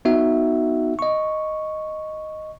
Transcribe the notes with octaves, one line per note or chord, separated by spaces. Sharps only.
B3 D#4 F#4 E5 F#5
D#5 C#6